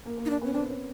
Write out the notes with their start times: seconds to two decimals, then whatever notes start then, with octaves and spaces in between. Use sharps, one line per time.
0.05 A#3
0.17 A#3
0.25 D#4
0.30 D4
0.41 B3 C#4
0.53 C4 D4
0.70 C#4